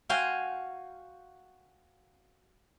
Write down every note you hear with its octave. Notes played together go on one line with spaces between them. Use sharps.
F#4 F5 G5 G#5 C6